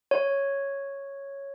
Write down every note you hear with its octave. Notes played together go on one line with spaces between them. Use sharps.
C#5